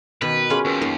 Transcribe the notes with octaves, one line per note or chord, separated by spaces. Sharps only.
B2 D#3 B4
C#4 F4 G#4 C6 C#6
D#2 A#4 B4 C#6
F#2 A#3 D#4 C6